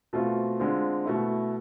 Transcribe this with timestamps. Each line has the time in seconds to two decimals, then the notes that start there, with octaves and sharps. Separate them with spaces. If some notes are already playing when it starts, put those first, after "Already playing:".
0.13 B2 A3 C4 F4
0.59 D3 G#3 C4 F4
1.06 B2 A3 E4